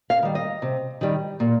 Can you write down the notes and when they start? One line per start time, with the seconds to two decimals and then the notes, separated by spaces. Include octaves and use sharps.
0.10 F5
0.23 D#3 G3
0.35 D#5
0.62 C3
1.01 D#3 G3
1.40 A#2